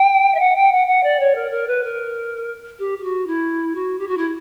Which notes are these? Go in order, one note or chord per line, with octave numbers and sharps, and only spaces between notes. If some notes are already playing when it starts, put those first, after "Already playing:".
Already playing: G5
E5
F#5
G5
F#5
F#5
D5
C#5
A#4
A#4
B4
A#4
G4
G4
F#4
E4
F#4
G4
F#4
E4